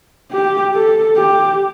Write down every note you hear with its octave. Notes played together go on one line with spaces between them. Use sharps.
G4
A4
G4